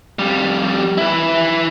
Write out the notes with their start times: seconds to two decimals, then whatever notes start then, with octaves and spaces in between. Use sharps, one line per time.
0.19 F2 G3
0.98 E4 B4